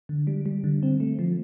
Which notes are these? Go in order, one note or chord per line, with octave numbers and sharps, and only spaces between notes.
D3
G3
G3
D3
C4
A3
F3